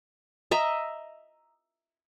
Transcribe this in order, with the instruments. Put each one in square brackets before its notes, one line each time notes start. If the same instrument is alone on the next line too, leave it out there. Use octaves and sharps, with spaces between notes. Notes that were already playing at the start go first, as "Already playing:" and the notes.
[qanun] D#5 E5 A#5